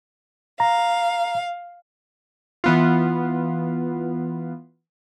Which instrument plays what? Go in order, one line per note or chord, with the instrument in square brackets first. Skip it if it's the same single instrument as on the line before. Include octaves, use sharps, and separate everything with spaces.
[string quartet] F5 [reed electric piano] A#5
[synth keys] E3 B3 F4